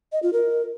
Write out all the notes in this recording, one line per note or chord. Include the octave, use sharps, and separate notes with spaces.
D#5
F4
A#4